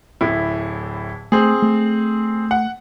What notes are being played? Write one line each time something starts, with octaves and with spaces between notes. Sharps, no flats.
D1 A2 E4
A3 C4 G#4
A3
F#5